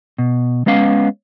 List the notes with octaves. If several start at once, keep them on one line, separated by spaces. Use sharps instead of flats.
B2
G#3 B3 C#4 F5